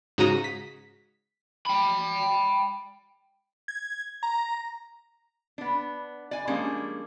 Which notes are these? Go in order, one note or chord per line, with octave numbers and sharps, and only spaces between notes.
G#2 C#3 F#4 A#5 D#6 A#6
B6
G5 B5
G#6
A#5
B3 D4
D5 G#5
F3 G3 G#3 A#3 C#4 D4